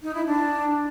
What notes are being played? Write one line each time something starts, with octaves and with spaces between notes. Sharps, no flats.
D#4
E4
D4